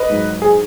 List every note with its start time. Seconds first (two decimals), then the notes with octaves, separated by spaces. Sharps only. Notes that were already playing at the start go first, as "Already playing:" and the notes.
Already playing: B4 D#5
0.10 G#2 F#3
0.42 G#4